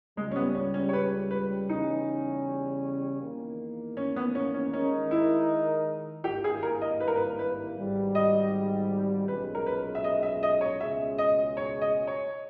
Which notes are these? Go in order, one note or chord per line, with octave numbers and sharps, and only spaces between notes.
C#2 C#3 G3 G#3
C#4
B3
C#4
C#4
C#5
B4
B4
E2 C#3 G3 C#4 D#4
E2 D#3 A#3
C#4
B3
C#4
C#4
D#3 G#3 C#4 D#4 A#4
E4
G#1 G2 G3 A#3 E4 G4
G#4
A#4
D#5
B4
A#4
B4
B4
G#1 G#2 G3
D#5
B1 A#2 G#3 C#4 G#4 B4
A#4
B4
E5
D#5
E5
D#5
C#5
C#2 B2 G#3 C#4 G#4 E5
D#5
C#5
D#5
C#5